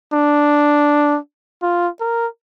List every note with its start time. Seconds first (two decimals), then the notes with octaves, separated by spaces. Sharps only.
0.13 D4
1.62 F4
2.00 A#4